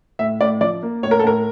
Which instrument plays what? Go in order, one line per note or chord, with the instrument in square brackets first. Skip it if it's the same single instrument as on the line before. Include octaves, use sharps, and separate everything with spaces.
[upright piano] A2 E5
A2 D5
F3 D5
A#3
A2 C#5
A#4
A4
A2 A#4